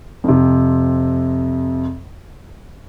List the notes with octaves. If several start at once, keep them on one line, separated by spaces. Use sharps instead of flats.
F2 C3